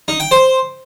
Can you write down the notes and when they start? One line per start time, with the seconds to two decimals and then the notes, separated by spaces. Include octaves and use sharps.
0.08 D#4
0.20 G5
0.31 C5